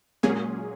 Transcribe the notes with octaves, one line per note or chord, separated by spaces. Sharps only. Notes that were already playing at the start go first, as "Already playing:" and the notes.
A#2 F#3 G#3 A#3 C#4 G#4